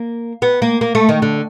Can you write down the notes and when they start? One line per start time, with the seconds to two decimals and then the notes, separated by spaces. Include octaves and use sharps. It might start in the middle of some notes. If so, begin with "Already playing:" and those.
Already playing: A#3
0.42 B3
0.62 A#3
0.81 A#3
0.95 A3
1.09 D#3
1.22 D3